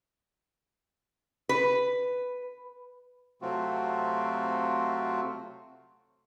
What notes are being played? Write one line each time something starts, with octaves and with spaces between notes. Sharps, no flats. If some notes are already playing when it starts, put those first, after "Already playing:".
B4
C3 F#3 A3 C4 F4 F#4